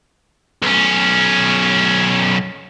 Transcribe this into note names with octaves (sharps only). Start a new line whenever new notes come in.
B1 C#4